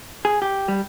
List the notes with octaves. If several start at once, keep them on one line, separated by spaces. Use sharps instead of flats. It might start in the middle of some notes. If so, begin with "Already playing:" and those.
G#4
G4
G3